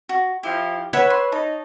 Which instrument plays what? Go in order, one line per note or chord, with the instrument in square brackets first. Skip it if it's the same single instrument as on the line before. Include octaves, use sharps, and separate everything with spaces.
[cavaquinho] F#4
[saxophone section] F3 E4 [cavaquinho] G4
[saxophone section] B4 [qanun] C#5 E5 [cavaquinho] F#5
[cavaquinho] C6
[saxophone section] D#4 [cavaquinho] A5